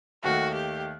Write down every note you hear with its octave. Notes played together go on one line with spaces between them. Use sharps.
D#2 D#3 A3 F#4
G4